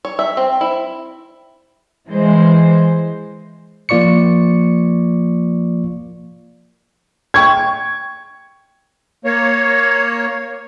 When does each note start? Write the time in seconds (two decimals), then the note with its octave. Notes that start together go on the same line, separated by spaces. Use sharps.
0.05 C#5
0.19 E5
0.37 C4
0.61 E4
2.08 E3 G#3 C5
3.89 F3 A#3 F4 D5 C#6 C#7
7.34 G5 C#6 G#6
9.25 A#3 C#5